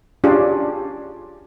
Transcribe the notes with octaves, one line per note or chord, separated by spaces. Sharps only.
C#4 D4 F4 G4 G#4